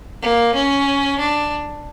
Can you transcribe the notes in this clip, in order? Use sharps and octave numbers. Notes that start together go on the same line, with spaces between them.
A#3
C#4
D4